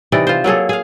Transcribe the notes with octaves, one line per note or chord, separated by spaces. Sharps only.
C3 E3 D#4 D5
F4 C5
F#3 A#3 G#4 A4
G#4 F5